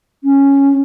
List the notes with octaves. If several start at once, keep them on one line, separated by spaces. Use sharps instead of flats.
C#4